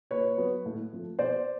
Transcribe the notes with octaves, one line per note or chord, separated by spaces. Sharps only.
A#2 B4 C#5
F#3 B3
A2
F3 A3
B2 C5 D5